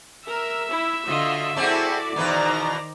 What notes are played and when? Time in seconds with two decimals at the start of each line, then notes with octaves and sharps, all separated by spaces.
0.28 A#4 E5 E6
0.70 E4
1.06 D3 F4 F#4 D#5
1.56 A3 C4 E4 F#4 G#4 A4 D5
2.16 E2 B2 D#3 B4 C5 A#5